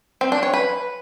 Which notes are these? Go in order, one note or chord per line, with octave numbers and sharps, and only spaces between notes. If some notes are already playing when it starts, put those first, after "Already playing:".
C4
D4
C#5
B4